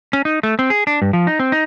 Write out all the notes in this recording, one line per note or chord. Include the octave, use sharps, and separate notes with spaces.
C#4
D#4
A3
C4
G#4
D4
G2
F3
D#4
C4
D#4